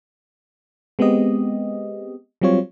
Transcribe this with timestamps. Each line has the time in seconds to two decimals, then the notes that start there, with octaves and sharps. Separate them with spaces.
0.99 G#3 B3 C4 G4 D#5
2.42 F#3 G3 C4 F4 C#5